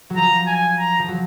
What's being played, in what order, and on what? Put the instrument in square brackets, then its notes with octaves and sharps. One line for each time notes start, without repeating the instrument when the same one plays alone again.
[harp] F#3
[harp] F3 [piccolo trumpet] A#5
[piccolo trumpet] G#5
A#5
[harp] F3
F#3